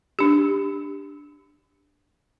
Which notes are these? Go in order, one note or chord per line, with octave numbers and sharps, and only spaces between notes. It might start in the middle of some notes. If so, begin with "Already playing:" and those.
D4 G4